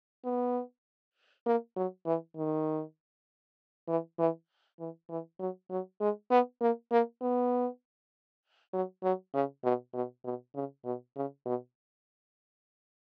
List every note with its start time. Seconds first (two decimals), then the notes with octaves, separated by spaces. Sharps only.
0.24 B3
1.46 A#3
1.76 F#3
2.06 E3
2.36 D#3
3.88 E3
4.19 E3
4.79 E3
5.09 E3
5.39 F#3
5.70 F#3
6.01 G#3
6.30 B3
6.61 A#3
6.92 A#3
7.21 B3
8.73 F#3
9.03 F#3
9.34 C#3
9.64 B2
9.94 B2
10.24 B2
10.55 C#3
10.85 B2
11.16 C#3
11.46 B2